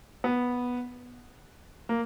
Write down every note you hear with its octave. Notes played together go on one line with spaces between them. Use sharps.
B3
A#3